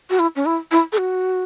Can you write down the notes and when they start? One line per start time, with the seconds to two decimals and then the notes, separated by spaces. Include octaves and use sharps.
0.10 F#4
0.19 E4
0.36 C#4
0.46 E4
0.71 E4
0.92 A4
0.98 F#4